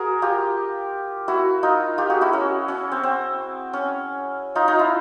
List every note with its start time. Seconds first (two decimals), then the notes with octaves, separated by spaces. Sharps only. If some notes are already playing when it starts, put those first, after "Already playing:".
Already playing: F#4 G#4 A#4
0.22 F4 G4
1.28 E4 F#4
1.63 D#4 F4
1.98 F4 G4
2.10 F#4 G#4
2.21 E4 F#4
2.33 C#4
2.68 C#4
2.92 C4
3.03 C4
3.73 C#4
4.55 D#4 F4
4.68 D#4 F4
4.79 E4